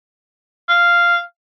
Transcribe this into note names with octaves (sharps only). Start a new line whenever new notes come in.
F5